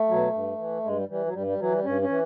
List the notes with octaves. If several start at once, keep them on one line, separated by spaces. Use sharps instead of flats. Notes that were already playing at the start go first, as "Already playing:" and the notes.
Already playing: A3
B2 F#3
G2
E3
G2 G#3
G3
E3 G3
F#3
G2 G3
G3
E3 F#3
G3
G2 C#4
C#4
E3